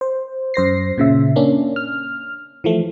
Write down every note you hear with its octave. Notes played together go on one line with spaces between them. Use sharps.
C5
F#2 C5 A#6 C7
A#2 C#3 E5
A#3 C#4 D4
F6
E3 F3 A3